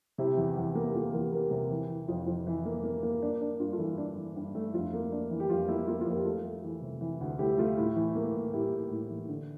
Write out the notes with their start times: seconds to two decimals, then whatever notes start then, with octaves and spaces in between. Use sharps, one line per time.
0.18 C3 E4 G4
0.37 E2
0.57 E2
0.75 A#3
0.84 G4
0.94 A#3 F4 A4
1.13 E2 G4 A#4
1.32 A#3 G4 A#4
1.51 C3
1.71 E3
1.89 E3
2.08 F2 F4
2.27 F2
2.47 E3
2.65 A#3
2.84 A#3
3.03 A#3
3.22 D4
3.41 D4
3.60 G2 F4
3.73 F4 A4
3.78 E3
3.86 E4
3.98 D4
4.17 E3
4.36 G2
4.55 A3
4.74 F2 F4
4.93 A#3
5.12 D4
5.31 E3
5.40 G4
5.49 F2 F4
5.68 A#3 E4
5.87 A#3 F4
6.01 F4
6.06 F2
6.13 G4 A#4
6.25 A3 F4 A4
6.44 A3
6.64 E3
6.82 C3
7.01 E3
7.21 D2
7.39 A3 E4 G4
7.58 A3 F4
7.77 A2 E4
7.96 E3
8.16 A#3
8.35 A2
8.53 A2 E4 G4
8.72 A2
8.91 A2
9.10 E3
9.28 D3